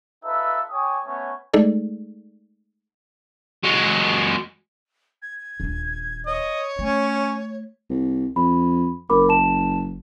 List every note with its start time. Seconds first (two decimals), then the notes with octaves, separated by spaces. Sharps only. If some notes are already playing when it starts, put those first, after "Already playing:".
0.24 D#4 F4 A4 B4 E5
0.71 G4 C#5 G#5 D#6
1.06 A3 B3 C#4 C#5
1.53 G#3 A3 D#4 G#4 A4 D5
3.63 F#3 G#3
5.22 G#6
5.60 D#1 D4
6.26 C#5 D#5
6.79 A3 C#4
7.90 C2
8.36 F2 B5
9.10 F#1 A#4 B5 D6
9.29 A5 E7